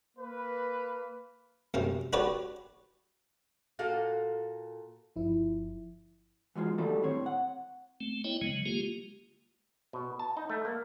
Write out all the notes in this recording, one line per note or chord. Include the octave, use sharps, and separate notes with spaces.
A#3 B4
F#2 C3 C#4
D4 F#4 G4 B4 C#5 D5
A#2 F#4 A4 F5
G1 F3 E4
E3 F#3 G#3 F4
D3 D#3 F#3 G3 A3 A4
A2 C4 C#5
F#5
A3 C4
B3 E4 C#5 D#5 G5
C#3 F#3 G#3
G#3 A#3 F4 G4
B2
A5
D#4
A3
A#3